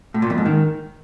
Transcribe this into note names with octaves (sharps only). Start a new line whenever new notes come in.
A2
A#2
F2
G#2
D#3